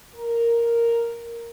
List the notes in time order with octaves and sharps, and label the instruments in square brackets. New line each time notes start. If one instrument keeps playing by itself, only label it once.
[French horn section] A#4